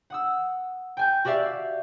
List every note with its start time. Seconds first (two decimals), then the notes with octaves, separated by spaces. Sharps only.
0.10 F#5 D#6 E6
0.97 G5 G#5 G6
1.25 F#4 G4 D5 E5 F5